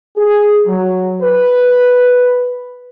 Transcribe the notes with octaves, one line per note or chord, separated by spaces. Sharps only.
G#4
F#3
B4